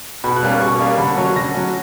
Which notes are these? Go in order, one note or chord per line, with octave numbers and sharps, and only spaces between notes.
B2 B5
F#6
G3 A#3 C#4
B2 C#6
G3 A#3 C#4
D3 B5
F#3 C#4 C#6
D3 A#6
F#3 C#4